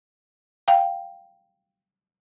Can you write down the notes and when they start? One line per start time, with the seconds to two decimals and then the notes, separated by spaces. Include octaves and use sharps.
0.68 F5 G5